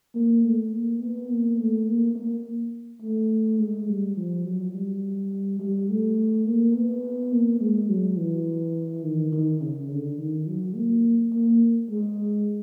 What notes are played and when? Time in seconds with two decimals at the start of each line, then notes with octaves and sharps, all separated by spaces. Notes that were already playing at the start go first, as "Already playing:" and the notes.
0.15 A#3
0.43 A3
0.73 A#3
1.01 B3
1.30 A#3
1.58 A3
1.88 A#3
2.15 A#3
3.02 A3
3.60 G#3
3.88 G3
4.16 F3
4.45 F#3
4.74 G3
5.59 G3
5.89 A3
6.46 A#3
6.75 B3
7.32 A#3
7.61 G#3
7.89 F#3
8.17 E3
9.04 D#3
9.32 D#3
9.61 C#3
9.89 D3
10.18 D#3
10.47 F#3
10.75 A#3
11.33 A#3
11.90 G#3